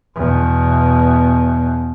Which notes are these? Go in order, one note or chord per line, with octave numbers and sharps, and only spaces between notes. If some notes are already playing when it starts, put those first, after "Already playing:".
E2 B2